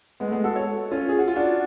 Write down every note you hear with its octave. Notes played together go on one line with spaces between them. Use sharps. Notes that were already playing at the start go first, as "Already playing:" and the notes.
G#3 B3
A3
G#3 B3
F#4 A4
A4 C#5
C#4 F4
G#4
F#4
F4
D4 F#4